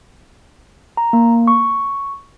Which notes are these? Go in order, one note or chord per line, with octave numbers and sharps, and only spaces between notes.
A#5
A#3
C#6